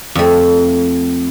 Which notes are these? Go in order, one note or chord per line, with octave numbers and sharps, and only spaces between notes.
F2 A3